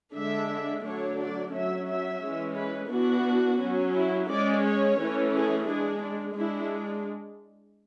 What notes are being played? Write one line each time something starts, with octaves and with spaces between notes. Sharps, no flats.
D3 G#3 D4 E5
D3 F#3 A3 D4 C#5
D5
F#3 C#4 E5
E5
E3 G#3 C#4
B4
E3 B3 D4 F#4
F#3 C#4
E4
G#3 C#4 D5
C#5
E3 A3 C#4
G#4
G#3 D4 G#4
D4
G#3 D4 E4